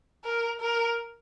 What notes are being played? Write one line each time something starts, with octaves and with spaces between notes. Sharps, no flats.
A#4
A#4